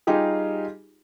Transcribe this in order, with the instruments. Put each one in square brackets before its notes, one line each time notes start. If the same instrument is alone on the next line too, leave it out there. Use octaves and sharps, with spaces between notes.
[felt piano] G3 D#4 F4 G4 G#4